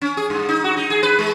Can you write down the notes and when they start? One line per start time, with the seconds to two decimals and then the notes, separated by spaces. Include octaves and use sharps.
0.02 C#4
0.17 G#4
0.30 G2
0.49 D#4
0.64 F#4
0.77 D#4
0.90 G#4
1.03 B4
1.19 G#3